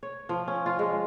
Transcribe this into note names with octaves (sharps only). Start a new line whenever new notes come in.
C#5
F3
C#4
F4
G#3